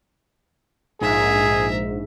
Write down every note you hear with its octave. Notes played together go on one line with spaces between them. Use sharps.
A#1 G#2 G#4 A#4 E5